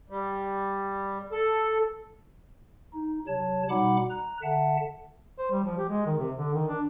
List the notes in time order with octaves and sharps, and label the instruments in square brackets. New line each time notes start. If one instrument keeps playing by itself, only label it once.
[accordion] G3
A4
[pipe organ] D#4
C3 F#3 C#5 A5
B2 G3 D#4 F#5 B5 D6
A#5 F#6
D3 E5 F#5 A5
[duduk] C5
G3
F3
G4
G#3
D#3
C3
D3
D#3
D4